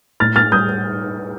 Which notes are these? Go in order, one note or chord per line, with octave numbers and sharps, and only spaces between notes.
A2 F6 A6
A2 F6 A6
G3 D#6 G6